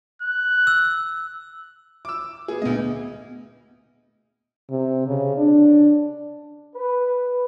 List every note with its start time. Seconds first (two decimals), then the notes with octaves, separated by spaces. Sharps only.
0.22 F#6
0.67 E6
2.05 D6 E6
2.48 B3 G#4
2.62 D2 A3 B3 D#5
4.70 C3
5.07 C#3
5.37 D4
6.76 B4